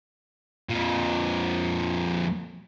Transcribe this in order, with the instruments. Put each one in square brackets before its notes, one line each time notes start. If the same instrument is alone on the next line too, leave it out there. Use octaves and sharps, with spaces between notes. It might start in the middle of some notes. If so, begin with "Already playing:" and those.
[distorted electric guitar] F2 A#2